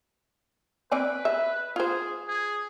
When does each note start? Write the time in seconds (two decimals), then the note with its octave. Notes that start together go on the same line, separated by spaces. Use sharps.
0.92 C4 B4 D5 G#5
1.25 E5
1.76 F4 G#4 C5
2.27 G#4